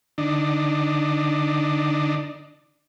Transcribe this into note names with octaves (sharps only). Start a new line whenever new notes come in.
D3 D4 D#4